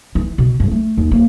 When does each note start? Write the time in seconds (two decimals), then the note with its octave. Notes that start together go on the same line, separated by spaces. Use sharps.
0.15 E3
0.38 B2
0.60 G2
0.71 A3
0.98 D#2
1.12 A#3